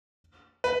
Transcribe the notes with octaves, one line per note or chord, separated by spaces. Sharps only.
B4